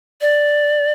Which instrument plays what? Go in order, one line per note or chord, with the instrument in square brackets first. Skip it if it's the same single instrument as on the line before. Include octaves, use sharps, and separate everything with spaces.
[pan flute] D5